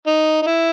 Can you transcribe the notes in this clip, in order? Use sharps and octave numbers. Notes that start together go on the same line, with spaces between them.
D#4
D#4
E4